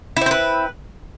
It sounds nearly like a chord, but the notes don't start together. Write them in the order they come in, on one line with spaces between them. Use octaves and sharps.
E4 C4 C5 B4